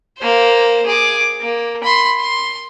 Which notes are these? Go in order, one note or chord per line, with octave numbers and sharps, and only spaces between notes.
A#3 C5
G#4 D6
A#3
B5 C6
C6